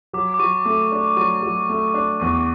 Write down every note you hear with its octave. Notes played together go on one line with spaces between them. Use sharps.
F#3 D6
D6
F#3 C#6
A3
D4
F#3 C#6
F#3
A3
D4
E2 C#6